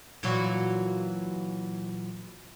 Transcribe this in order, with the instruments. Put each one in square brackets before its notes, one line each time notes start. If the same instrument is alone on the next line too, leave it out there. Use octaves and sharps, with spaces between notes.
[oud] A#2 E3 F#3